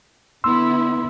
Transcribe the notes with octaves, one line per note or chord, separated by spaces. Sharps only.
D3 B3 E4 C6 E6